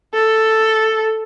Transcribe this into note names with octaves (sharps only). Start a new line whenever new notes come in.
A4